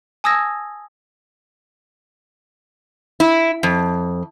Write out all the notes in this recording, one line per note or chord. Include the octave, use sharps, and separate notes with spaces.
G#5 A5 D#6 E6 G#6 A#6
E4
F2